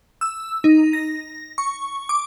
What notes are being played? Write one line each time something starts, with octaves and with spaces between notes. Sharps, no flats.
E6
D#4
A#6
C#6
D6